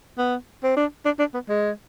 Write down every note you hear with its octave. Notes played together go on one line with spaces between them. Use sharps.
B3
C4
D4
D4
D4
B3
G#3